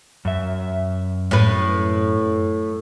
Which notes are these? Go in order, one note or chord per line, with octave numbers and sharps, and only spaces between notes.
F#2 E5
A2 B4